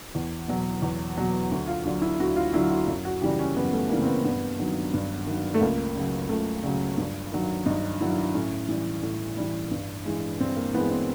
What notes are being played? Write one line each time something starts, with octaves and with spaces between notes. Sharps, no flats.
E2
B2 F#3
E2
B2 F#3
D2
F4
D3 F#3 F4
E4
D2 F#4
F4
D3 F#3 E4
F#4
F#2
F#4
C#3 E3 G3 G4
C#4
F#2 B3
A3
C#3 E3 G3 A#3
C4
B3
G2 B3
D#3 F#3
G2
D#3 F#3
A3
C#2 A#3
C#3 F#3
C#2 A3
C#3 F#3
G2
D#3 F#3
G2 D#4
D#3 F#3 E4
A2 C#4
E3 G3
A2
E3 G3
G2
E3 G#3
G2 C4
A#3
E3 G#3 B3
C4